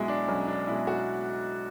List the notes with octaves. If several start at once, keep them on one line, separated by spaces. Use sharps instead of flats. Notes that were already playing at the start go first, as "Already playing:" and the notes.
Already playing: B1 B2 G#3 E4
D4
B1 C#4
D4
B2 G#3 E4
F#4